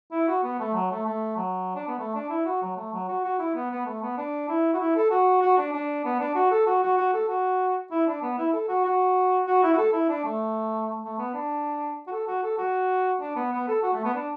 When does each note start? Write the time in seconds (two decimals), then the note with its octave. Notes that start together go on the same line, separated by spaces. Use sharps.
0.12 E4
0.28 F#4
0.43 B3
0.59 A3
0.74 F#3
0.91 A3
1.06 A3
1.37 F#3
1.75 D4
1.88 B3
1.99 A3
2.15 D4
2.30 E4
2.46 F#4
2.62 F#3
2.77 A3
2.93 F#3
3.09 F#4
3.24 F#4
3.39 E4
3.55 B3
3.71 B3
3.85 A3
4.02 B3
4.18 D4
4.49 E4
4.74 F#4
4.80 E4
4.96 A4
5.11 F#4
5.42 F#4
5.58 D4
5.73 D4
6.05 B3
6.20 D4
6.35 F#4
6.51 A4
6.67 F#4
6.83 F#4
6.97 F#4
7.14 A4
7.28 F#4
7.91 E4
8.07 D4
8.22 B3
8.38 E4
8.53 A4
8.68 F#4
8.85 F#4
9.47 F#4
9.63 E4
9.73 F#4
9.78 A4
9.93 E4
10.09 D4
10.25 A3
11.03 A3
11.19 B3
11.34 D4
12.07 F#4
12.12 A4
12.27 F#4
12.43 A4
12.58 F#4
13.21 D4
13.36 B3
13.52 B3
13.68 A4
13.83 F#4
13.93 A3
14.05 B3
14.14 D4